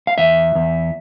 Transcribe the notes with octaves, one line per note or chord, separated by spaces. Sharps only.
F5
E2 E5
E2